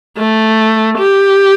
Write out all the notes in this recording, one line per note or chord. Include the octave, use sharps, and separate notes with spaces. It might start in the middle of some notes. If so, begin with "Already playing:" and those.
A3
G4